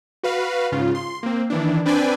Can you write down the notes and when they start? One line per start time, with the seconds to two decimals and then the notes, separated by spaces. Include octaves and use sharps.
0.23 F#4 B4 F5
0.72 G#2 C#3 F4
0.95 C6
1.23 A#3 C4
1.50 D#3 E3 D4
1.86 C4 D4 B4 D5 G5 G#5